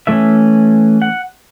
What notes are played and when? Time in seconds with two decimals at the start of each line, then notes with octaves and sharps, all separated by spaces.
0.07 E3 A3 C#4 E5
1.02 F#5